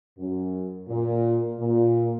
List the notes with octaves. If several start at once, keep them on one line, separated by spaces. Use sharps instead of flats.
F#2
A#2
A#2